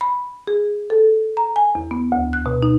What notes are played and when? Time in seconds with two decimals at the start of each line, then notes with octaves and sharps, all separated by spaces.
0.01 B5
0.47 G#4
0.90 A4
1.37 A#5
1.56 G#5
1.75 E2
1.91 B3
2.12 D2
2.33 F#6
2.46 B2
2.63 D#4